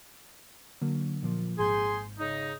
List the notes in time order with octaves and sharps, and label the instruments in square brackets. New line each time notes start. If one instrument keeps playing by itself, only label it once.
[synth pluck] D3 F#3 A#3
A#2 F3 A#3
[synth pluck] G#1 G#2 G6 [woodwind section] G#4 G#5 C6
[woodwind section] C#3 D#4